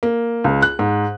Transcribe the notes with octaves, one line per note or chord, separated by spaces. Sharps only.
A#3
C#2
F#6
G#2